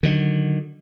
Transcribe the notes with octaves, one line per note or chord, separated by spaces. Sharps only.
D3 D#3 F#3